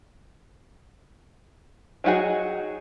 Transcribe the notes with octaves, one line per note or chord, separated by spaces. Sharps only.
F#3 D4 D#4 F#4 G#4